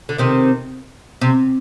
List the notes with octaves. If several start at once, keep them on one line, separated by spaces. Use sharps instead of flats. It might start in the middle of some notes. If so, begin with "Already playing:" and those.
D3
C3 D#3
C3